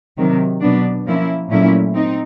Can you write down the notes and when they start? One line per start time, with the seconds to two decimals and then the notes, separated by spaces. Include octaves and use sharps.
0.17 C3 D#3 F#3
0.61 B2 F#3 B3 D4
1.05 F3 A#3 C#4 E4
1.50 A#2 F#3 A3 C#4 E4
1.95 C4 D#4